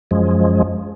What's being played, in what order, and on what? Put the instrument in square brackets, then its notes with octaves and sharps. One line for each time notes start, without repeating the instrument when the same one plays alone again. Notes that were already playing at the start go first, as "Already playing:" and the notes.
[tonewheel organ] F#2 F3 G#3